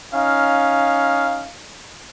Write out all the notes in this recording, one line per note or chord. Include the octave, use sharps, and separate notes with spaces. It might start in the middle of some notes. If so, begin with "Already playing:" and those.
C#4 D#4 F5